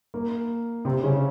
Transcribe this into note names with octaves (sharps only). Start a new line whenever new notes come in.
A#3
C3 C4
C#3 C#4